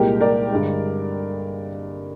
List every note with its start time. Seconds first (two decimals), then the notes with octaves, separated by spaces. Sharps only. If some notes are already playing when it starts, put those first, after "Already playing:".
Already playing: C2 A#2 G#3 G4 A#4
0.21 A#4 D5
0.51 G2 D3 G#3